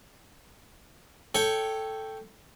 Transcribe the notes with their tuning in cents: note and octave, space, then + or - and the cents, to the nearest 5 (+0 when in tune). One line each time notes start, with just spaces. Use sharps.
A4 +0 C#5 +0 G5 +0